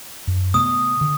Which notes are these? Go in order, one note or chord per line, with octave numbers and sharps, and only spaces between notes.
F#2
C3 A3 B3 D#6
D3